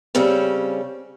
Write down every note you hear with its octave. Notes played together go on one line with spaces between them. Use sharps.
C#3 G3 C4 C#4